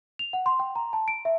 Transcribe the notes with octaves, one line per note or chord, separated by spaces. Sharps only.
F7
F#5
C6
G5
A#5
A5
D7
E5